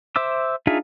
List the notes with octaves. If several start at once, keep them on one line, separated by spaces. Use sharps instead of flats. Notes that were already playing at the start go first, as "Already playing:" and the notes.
C5 E5 D6 E6
D4 D#4 F4 G#4 E5